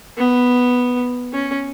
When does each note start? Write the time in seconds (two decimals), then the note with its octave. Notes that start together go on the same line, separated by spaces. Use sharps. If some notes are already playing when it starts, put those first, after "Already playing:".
0.17 B3
1.33 C#4